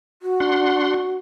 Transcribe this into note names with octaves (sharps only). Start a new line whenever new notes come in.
F#4
D4 F#5 C6